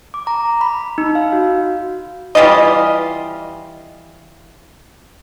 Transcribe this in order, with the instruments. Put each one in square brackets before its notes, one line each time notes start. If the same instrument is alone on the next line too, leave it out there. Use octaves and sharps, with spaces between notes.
[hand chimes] D6
A#5
B5
D#4
F5
F#4
[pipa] E3 G3 F4 D#5